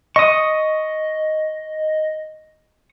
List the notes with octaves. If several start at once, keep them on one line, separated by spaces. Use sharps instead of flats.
D#5 C#6 D#6